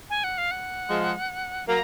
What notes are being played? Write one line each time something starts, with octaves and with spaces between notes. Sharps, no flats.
G#5
F#5
F5
F#5
F3 G#3
F#3 A#3 A#5